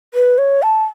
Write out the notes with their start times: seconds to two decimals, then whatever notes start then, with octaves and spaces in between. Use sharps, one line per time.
0.14 B4
0.38 C#5
0.63 A5